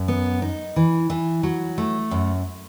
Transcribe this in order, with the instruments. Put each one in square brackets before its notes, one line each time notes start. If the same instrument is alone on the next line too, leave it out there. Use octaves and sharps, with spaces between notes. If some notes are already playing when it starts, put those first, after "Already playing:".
Already playing: [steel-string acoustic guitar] F#2
B3
D#4
E3
E3
F#3
A3
F#2